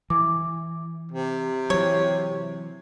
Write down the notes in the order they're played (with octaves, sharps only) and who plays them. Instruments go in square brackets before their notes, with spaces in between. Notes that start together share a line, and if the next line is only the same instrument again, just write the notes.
[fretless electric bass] E3 [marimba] D6
[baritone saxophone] C3
[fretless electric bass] E3 F#3 [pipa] C#5